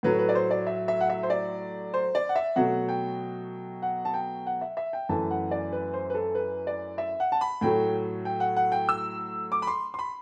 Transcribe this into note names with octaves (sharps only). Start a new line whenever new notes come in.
A2 F#3 A3 B4
B4
D5
C5
D5
E5
E5
F#5
E5
C5
D5
C5
D5
F#5
E5
B2 F#3 A3 F#5
G5
F#5
A5
G5
F#5
E5
E5
G5
F#2 E3 A3 A5
F#5
D5
B4
C5
B4
A4
B4
D5
E5
F#5
A5
B5
A2 F#3 A3 G5
G5
F#5
F#5
G5
E6
D6
B5
C6
C6
B5